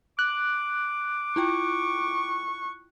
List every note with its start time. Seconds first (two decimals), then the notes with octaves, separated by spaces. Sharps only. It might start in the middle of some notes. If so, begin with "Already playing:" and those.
0.19 D6 F#6
1.36 E4 F4 G5 C#6